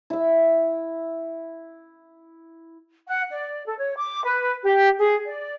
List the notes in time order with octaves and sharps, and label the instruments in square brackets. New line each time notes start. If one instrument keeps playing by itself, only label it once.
[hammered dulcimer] E4 E5
[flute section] F#5
D5
A4
C#5
D6
B4
G4
G#4
D5